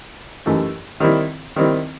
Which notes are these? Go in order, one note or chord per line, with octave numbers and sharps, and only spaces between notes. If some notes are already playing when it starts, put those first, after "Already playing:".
F#2 E3 A3 D#4 G4
D#3 G3 C4 E4
D#3 G3 C4 E4